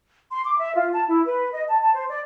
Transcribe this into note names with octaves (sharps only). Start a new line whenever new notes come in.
C6
D6
E5
F4
A5
E4
B4
D#5
A5
A5
C5
D5